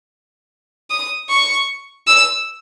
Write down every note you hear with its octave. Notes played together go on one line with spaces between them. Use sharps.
D#6
C#6
E6